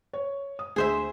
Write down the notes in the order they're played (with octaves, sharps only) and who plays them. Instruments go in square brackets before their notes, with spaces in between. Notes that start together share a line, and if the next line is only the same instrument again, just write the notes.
[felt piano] C#5
D#6
[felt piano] D2 [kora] G#4 C5 E5